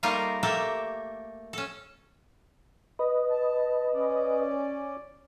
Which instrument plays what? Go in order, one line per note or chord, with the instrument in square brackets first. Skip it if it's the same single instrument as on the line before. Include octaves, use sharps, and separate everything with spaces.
[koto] G3 A3 A#3 D#4 F4 A#4
A3 A#3 G4 A4 A#4 E5
C#4 A4
[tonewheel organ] B4 D#5
[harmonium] A5
C#4 D5